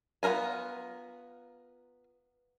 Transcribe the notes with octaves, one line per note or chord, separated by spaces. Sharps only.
B3 F4 A4 A#4 G#5